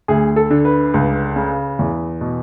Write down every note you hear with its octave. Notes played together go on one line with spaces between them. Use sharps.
D2 G#4
A4
D3
B4
C#2
C#3
E2
B2